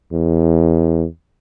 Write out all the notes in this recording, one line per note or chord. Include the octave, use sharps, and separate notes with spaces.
E2